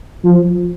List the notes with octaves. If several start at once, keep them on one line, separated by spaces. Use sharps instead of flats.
F3